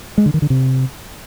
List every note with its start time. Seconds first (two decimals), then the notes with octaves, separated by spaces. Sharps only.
0.18 G#3
0.26 D3
0.34 D#3
0.42 D3
0.50 C3